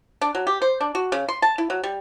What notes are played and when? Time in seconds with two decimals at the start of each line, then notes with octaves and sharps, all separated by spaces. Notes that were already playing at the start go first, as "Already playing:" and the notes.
0.21 D4
0.35 F#3
0.47 G4
0.62 C5
0.81 D4
0.95 F#4
1.12 C#3
1.29 C6
1.42 A5
1.58 E4
1.70 F#3
1.83 G3